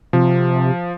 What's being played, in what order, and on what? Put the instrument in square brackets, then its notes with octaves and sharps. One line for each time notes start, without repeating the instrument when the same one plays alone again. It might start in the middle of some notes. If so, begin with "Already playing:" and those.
[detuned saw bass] C3 [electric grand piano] F3